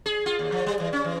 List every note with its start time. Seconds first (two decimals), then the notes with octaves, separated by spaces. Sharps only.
0.06 G#4
0.26 F4
0.39 D#2
0.52 F3
0.66 G3
0.80 E3
0.93 C#4
1.05 E3